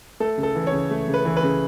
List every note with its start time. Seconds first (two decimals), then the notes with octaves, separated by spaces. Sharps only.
0.20 A3 A4
0.38 C#3
0.43 A4
0.55 E3
0.67 C#5
0.72 C#3
0.91 A3
1.08 C#3
1.14 B4
1.25 E3
1.37 B4
1.43 C#3